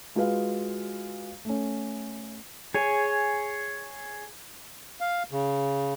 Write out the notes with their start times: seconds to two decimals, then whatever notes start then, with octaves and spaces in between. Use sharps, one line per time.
0.15 G#3 F4 F#4 G#4 B4 F5
1.45 A3 C#4
2.74 G#4 C#5 G#5
5.01 F5
5.32 C#3